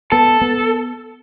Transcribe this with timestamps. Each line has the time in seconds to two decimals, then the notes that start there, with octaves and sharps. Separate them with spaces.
0.12 B3 A4
0.41 B3